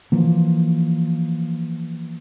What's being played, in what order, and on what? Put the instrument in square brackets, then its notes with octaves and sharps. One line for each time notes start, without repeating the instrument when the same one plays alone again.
[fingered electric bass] E3 F3 A#3